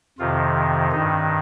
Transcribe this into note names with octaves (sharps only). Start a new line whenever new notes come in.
F2 C3 D#3 F4
G2 D#3 D#4